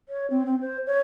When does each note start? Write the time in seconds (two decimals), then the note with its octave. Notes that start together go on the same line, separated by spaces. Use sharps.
0.09 C#5
0.30 C4
0.46 C4
0.61 C5
0.87 C#5